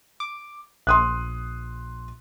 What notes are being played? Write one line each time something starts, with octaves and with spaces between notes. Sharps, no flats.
D6
A#1 C6 D#6 F#6